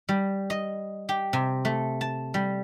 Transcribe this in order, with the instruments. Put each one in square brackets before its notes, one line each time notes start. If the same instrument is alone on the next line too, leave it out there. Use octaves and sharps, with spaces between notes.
[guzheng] G3
D#5
G4
C3
A3
A5
G3